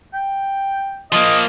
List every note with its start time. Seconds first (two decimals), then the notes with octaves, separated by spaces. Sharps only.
0.14 G5
1.12 F3 A#3 D#5